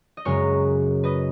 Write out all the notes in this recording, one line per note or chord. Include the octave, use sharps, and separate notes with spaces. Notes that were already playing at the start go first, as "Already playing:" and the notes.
D#5
F#2 C#3 G#3 A#4 C#5
B4 D#5